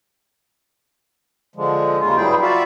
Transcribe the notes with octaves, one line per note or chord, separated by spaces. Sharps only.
D3 F3 G#3
D#2 G#2 C#3 G#3 F4
G2 F#3 G3 E4 G#4 G5
F4 F#4 D5 E5 F5